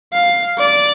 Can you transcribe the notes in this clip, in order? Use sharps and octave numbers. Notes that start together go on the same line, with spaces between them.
F5
D5